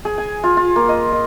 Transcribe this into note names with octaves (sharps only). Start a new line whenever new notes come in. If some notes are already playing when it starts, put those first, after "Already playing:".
G#4
G#5
F4
F4
A#3
D#5
D#5